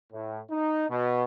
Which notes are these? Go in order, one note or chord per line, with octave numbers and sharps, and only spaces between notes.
A2
D#4
B2